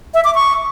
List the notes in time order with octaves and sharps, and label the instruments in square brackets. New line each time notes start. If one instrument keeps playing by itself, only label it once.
[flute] E5
D6
C#6